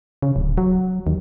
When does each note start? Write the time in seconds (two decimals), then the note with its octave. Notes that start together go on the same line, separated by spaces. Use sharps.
0.22 C#3
0.36 D1
0.58 F#3
1.07 D#2